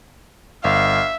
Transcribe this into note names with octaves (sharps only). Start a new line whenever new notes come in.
G1 E5 F5